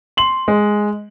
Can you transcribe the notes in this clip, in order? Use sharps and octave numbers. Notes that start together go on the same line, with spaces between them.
C6 F#7
G#3